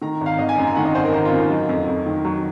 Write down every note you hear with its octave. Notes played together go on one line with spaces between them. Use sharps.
D#3 A#5
G#1
F5
G#1 D#5
G#5
F#2 A#5
G#5
D#3 F#5
D#5
G#1 C5
A#4
G#1 C5
F4
F#2
D#4
F#3 D#4
F2
F2
D#3
F#3